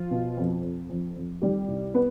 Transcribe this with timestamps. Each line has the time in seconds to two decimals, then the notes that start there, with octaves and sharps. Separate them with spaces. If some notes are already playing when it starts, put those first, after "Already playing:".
Already playing: F3 F4
0.11 B2
0.37 F2
0.63 F2
0.90 F2
1.16 F2
1.42 D#3 G3 G4
1.68 C2
1.94 B3 B4